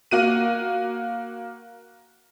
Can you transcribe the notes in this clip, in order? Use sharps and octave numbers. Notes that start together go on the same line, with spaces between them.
A#3 F#4 D#7